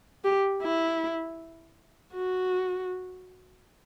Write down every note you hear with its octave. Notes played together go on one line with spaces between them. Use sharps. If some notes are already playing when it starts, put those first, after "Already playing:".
G4
E4
F#4